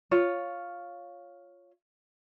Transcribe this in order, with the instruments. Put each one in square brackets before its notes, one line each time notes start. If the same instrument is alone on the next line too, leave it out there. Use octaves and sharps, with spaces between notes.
[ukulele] F4 C#5